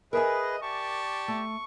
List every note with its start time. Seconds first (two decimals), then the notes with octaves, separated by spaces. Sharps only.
0.13 G#4 A#4 B4 D#5 E5 G#5
0.62 G4 D5 A5 C#6
1.28 A3